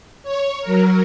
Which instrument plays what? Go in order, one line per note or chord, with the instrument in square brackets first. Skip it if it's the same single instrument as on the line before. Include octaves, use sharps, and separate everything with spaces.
[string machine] C#5
F#3 A#4